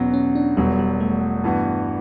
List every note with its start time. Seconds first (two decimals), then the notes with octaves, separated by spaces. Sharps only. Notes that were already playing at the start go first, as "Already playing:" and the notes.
Already playing: E2 B2 F#3 B3 C#4
0.14 C#4
0.35 D4
0.57 E1 E2 B2 F#3 G3
0.79 G3
1.00 A3
1.44 G2 E3 B3 F#4